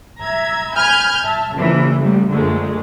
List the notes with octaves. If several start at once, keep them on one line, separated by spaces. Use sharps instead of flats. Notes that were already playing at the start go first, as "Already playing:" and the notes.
E5 A#5 G#6
G#5 B5 F6 G6 G#6
E5 A5
A#1 C#3 E3
A1 G3
A#1 F#2 D3 G#3 A3